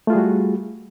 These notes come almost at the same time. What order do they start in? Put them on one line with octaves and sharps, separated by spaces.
A3 F4 G#4 G3 F#4